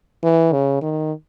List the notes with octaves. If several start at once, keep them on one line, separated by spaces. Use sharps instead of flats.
E3
C#3
D#3